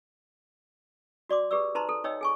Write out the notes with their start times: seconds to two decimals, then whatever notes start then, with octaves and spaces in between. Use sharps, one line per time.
1.29 F#4 D5 C6 D6
1.51 G4 G#4 B4 D5 E6
1.75 D#4 B4 C5 A5 A#5 C6
1.89 A4
2.04 D#4 C#5 D#5 G5 E6
2.21 G#4 G#5 C#6